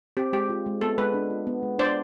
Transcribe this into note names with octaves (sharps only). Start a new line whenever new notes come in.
C4 G4
G#3 G4
F4
G#3
B3 A4
G#3 B4
D4
F4
B3
G#3
D4 C5 D5